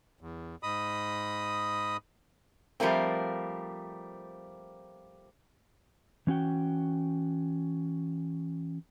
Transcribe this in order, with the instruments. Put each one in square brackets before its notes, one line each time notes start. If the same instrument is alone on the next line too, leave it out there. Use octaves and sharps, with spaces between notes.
[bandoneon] E2
G#2 D#5 B5 D#6
[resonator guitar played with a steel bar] F3 G3 A3 A#3 C4
[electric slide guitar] E3 C#4 F#4 G5